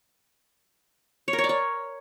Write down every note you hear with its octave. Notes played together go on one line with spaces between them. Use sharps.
C#5
A#4
C#5
D5
C#5